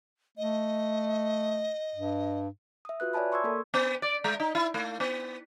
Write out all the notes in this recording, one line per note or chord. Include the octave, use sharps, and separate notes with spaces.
A3 D#5
G2
E5 D#6
F4 F#4 B4 F#6
C#5 D5 E5 G#5 A5 B5
C6 C#6 D#6 E6 G#6
A#3 A4 A#4
B3
D5
G#3
D#4
E4
A3
B3